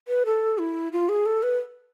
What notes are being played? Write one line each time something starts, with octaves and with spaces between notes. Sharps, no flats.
B4
A4
E4
F4
G#4
A4
B4